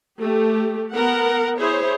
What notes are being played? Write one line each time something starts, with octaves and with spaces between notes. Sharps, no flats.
A3 G4
B3 A#4 F#5
E4 G#4 C5 C#5